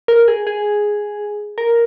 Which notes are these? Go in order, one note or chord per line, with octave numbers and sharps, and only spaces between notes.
A#4
G#4
G#4
A#4